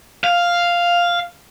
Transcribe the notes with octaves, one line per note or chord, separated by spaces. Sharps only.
F5